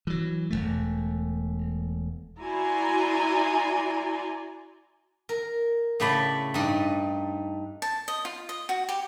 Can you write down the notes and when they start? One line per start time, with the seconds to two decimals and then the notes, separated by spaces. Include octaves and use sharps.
0.07 E3 F#3
0.50 E1 C#2 A3
2.40 E4 F#4 D5 G#5 A#5 C6
5.29 A#4
6.00 A2 C#3 A3 D5 B5
6.54 G2 D#4 D5
7.82 A5
8.08 D#5
8.25 F4
8.49 D#5
8.69 F#4
8.89 G4